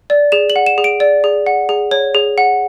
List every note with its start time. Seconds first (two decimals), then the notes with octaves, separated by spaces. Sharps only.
0.10 D5
0.32 G#4 E7
0.50 F#7
0.56 F#5
0.66 E7
0.78 G#4
0.84 D7
1.00 D5
1.24 G#4
1.46 F#5
1.69 G#4
1.91 C#5
2.14 G#4
2.38 F#5